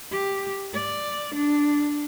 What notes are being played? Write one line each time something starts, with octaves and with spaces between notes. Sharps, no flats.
G4
D5
D4